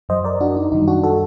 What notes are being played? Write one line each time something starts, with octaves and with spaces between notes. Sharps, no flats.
F#2 F#3 C5 D#5
A#4 D5
D4 F#4
D#4
F#2 D#3 G3 D#4
D4 F#4
F#4 A4